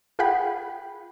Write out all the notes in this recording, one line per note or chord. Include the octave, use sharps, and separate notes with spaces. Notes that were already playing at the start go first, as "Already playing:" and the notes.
F4 G#4 F#5 G5 B5